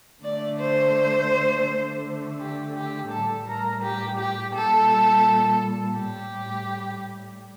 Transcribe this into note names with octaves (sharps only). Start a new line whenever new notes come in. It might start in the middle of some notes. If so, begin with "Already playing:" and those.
D3 A3 D5
C5
D3 A3
G4
G4
A2 G3 A4
A#4
G4
G4
A#2 G3 A4
A2 G3 G4